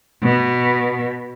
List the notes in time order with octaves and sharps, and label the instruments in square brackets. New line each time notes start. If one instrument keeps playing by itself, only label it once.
[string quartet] B2